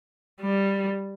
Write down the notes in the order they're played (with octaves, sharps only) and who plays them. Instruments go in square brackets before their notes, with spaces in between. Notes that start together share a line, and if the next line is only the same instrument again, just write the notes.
[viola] G3